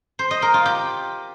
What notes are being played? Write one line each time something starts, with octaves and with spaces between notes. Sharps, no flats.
C5
D#5
A#4
F4
G4